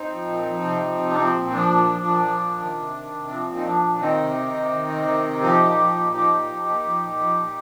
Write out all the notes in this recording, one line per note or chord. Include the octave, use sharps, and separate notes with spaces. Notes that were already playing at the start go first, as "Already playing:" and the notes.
Already playing: C4 D#4
F3
A#2
F3
C3
F3
C3
D4
F3 C4
A#2
F3 D4
A#2
F3
A#2
F3
A#2
D#3
C3
D#3
C3
F3 C4
A#2
D#4
F3 D4
A#2
D#3 C4 D#4
C3
D#3
C3
D#3
C3
D#3
C3
F3 D#4 G4
A#2
F3
A#2
F3 D#4 G4
A#2
F3
A#2
F3
A#2
F3
A#2